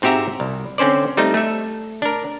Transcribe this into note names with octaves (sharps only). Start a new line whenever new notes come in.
G#2 C4 F#4 G4 E5 A#5
C2
D3 C4 C#4 C5 D5
G3 A3 C4 D#4
A3 A4 E5
D4 A#4